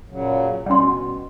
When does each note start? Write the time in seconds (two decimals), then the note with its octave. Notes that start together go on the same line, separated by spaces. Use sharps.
0.09 A#2 C#3 F#3
0.66 B2 G3 C#4 G5 C6